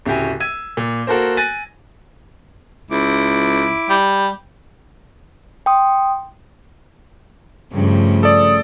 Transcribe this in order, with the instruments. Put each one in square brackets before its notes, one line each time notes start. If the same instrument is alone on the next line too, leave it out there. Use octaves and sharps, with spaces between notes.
[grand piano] D1 C#3 E4 F#4 G4 G#5
E6 G#6 D#7
A#2
A#3 F#4 A4 A#4 C5
G#5 F#6 A6 A#6 D#7
[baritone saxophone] C#2 [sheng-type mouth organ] E4 D6
[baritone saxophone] G3
[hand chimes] G5 C6 D#6
[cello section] G2 [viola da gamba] C#3 F3 A3
[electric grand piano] A4 D5 [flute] D#6